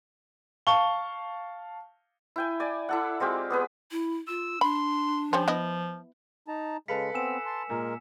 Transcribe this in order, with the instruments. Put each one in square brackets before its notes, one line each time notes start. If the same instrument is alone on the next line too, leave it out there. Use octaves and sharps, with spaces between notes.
[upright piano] F5 A5 C#6 G7
[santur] E4 G5 G#5
D5 G#5
E4 A4 F#5
G#3 C4 F4 G4
B3 G#4 B4
[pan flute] E4
[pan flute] F4 [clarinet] E6
[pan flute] D4 [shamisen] B5 [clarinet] C6
[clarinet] F3 [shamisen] G3 C#4 C5
[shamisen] B3 E4 D#5
[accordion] D#4 A5 A#5
[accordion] C#3 G#3 [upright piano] A4 B4 F5 [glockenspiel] B6 C#7
[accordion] B3 C4 [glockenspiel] G#5 E6 E7
[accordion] A5 C6
[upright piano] A#2 [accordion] G#3 A#4